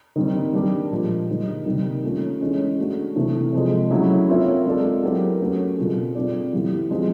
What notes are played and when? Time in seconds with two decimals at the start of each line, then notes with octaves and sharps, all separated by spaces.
0.16 D#3 G3 C4
0.53 G3 A#3 D4 G4 A#4
0.91 A#2 F3 G#3
1.28 D3 G3 A#3 D#4
1.65 C3 D#3 G3 A#3
2.03 A3 C#4 F4
2.41 E3 G#3 C#4
2.79 A3 D4 F#4
3.16 C3 E3 A3
3.53 C3 F3 G#3
3.90 F#3 A3 C#4 E4
4.28 C4 F4 A#4 C#5 E5
4.66 G#3 C4 F4 A4 D5
5.03 F#3 B3 E4 G4 A#4
5.41 F#3 A3 C#4 F#4
5.78 B2 G3 C4 F4 G#4
6.15 C4 F4 A4 D5
6.53 E3 G3 B3 E4 G4
6.90 F3 G#3 C4 F4